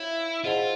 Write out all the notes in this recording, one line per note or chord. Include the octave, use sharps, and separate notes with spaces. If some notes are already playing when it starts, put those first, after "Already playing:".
Already playing: E4 C#5 F5
F4 G#4 C5 D#5 F#5 A5